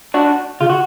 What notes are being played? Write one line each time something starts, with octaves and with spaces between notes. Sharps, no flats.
D4 F#4
C#3 F4
F#4